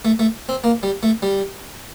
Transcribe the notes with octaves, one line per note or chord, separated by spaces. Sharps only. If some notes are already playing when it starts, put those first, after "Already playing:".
A3
A3
C4
A#3
G3
A3
G3